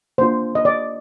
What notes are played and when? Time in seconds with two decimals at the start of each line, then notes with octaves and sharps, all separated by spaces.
0.18 A#3 D4 F4 C5
0.55 D#5
0.65 D5